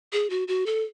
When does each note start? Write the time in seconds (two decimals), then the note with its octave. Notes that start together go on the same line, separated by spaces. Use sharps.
0.13 G#4
0.30 F#4
0.48 F#4
0.66 A4